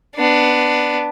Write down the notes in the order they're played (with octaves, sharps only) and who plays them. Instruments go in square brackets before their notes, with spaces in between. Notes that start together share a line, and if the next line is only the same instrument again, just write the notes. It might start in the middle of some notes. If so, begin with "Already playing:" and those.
[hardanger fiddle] B3 D4